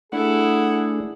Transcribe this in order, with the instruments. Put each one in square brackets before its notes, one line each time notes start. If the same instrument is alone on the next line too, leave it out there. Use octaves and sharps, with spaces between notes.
[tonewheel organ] A3 D4 [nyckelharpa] E4 A4 [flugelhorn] G#4 [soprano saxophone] F#5